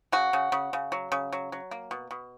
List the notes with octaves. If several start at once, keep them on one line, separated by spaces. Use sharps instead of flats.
C#3 F#4
C#3
C#3
C#3
F#3
C#3
F#3
F#3
A#3
B2
B2